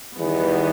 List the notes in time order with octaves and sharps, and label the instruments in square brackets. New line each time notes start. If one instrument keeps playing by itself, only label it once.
[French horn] E2 [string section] D#3 G3 B3